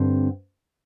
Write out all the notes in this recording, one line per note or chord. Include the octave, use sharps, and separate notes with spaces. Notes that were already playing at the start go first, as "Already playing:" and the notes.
Already playing: G2 D3 C4